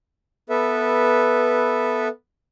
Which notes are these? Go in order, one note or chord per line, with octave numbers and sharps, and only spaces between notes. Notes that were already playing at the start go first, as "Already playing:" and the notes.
B3 A4 B4 E5